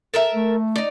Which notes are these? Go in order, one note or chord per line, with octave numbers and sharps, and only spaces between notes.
A4 A#4 E5
A3
D#4 D5